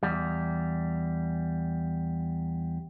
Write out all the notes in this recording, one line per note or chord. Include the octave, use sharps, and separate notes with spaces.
E2 G3